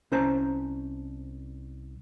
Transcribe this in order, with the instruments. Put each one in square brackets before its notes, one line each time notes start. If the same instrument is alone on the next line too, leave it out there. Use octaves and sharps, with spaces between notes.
[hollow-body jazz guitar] C2 C#4 C5 A5 A#5